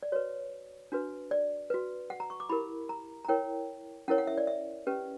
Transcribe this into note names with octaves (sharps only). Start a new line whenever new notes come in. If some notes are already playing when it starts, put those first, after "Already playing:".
D5
F#4 B4 C#5
D4 F#4 B4
D5
F#4 B4
F#5
A#5
C#6
D6
E4 G4 A#4 B5
A#5
A#5
E4 A#4 C#5 G5
C#4 E4 A#4 C#5 F#5
F#5
E5
D5
E5
C#4 G4 B4